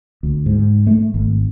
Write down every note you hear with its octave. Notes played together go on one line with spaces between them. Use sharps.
D2
G#2
A3
G#1